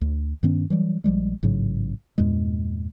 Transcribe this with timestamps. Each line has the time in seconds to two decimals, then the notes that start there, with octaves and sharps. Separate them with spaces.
0.01 D2
0.43 G2 D#3 B3 C#4
0.70 E3 F#3 G3
1.04 A#1 F3 G3 G#3
1.43 A1 G#2 C#3 F#3
2.18 E2 G2 A#2 G#3